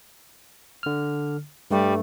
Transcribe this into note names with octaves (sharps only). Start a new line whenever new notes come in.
D3 F6
G2 G3 A3